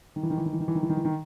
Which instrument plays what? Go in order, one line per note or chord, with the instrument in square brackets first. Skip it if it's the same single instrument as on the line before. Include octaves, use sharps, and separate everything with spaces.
[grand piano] D#3
E3
D#3
E3
D#3
E3
D#3
E3
D#3
E3
D#3
E3
D#3